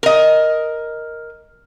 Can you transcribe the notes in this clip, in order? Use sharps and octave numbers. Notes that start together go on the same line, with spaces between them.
A#4 D#5